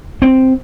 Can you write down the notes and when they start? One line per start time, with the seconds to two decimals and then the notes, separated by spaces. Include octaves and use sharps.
0.22 C4